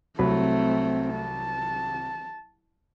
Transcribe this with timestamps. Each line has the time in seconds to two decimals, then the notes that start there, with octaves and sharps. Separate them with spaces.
0.19 C2 F#3 A3 C4 B5
1.15 A5